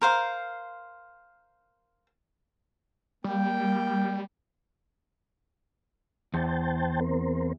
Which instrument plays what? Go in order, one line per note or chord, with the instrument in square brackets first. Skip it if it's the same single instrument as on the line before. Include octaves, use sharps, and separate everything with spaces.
[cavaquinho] A#4 C5 F5
[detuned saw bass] G3 [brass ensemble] A#3 G5
[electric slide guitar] E2 [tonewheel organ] C5 G5 A5
[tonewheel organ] C4 A#4 C5